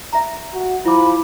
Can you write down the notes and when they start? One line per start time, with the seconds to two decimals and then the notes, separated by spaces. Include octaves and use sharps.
0.13 E5 A#5
0.54 F#4
0.85 F3 E4 B5 D6